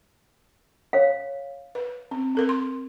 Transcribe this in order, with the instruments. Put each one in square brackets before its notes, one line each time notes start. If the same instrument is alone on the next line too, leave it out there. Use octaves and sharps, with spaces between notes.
[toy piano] C#5 F5
[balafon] B4
C4
C4 A4 A#4
C6